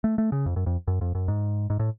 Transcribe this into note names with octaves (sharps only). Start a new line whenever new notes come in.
A3
A3
C#3
F2
F#2
F2
F#2
F2
F#2
G#2
G#2
A2